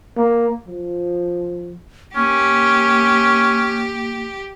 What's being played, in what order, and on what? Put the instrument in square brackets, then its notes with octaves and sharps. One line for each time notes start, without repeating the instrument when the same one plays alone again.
[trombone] A#3
F3
[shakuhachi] A#3 [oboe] C#4 [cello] G4